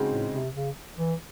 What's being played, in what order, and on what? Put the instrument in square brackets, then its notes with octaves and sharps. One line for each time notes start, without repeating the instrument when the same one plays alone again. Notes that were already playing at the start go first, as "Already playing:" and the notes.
Already playing: [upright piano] C#3 G#3 C4 D#4 F#4
[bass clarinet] A2
C3
C#3
E3